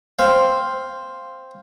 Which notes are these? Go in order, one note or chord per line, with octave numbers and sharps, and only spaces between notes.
C4 F5